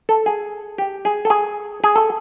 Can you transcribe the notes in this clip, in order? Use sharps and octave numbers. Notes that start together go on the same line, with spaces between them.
A4
G#4
G4
G#4
A4
G#4
G#4
A4